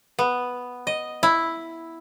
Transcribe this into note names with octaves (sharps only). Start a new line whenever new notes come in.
B3
D#5
E4